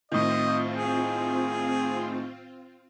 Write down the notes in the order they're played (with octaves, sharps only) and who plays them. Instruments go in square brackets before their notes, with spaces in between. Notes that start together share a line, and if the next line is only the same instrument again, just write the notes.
[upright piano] A2 D#3 [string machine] C4 F4 [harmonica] D#5
[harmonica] G#4